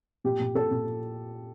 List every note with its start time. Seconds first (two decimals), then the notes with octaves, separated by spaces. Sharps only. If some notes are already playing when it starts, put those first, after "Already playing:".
0.24 A#2 G4
0.40 A#2
0.55 A#2 A4
0.71 A#2